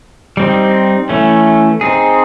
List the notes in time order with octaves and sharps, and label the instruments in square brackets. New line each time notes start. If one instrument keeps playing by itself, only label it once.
[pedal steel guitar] G3 C4 D#4
E3 A3 C#4
C4 D#4 G#4